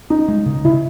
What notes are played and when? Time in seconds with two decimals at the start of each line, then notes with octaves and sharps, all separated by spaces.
0.10 C#4 D#4
0.28 G#3
0.46 C#3
0.64 C#3 E4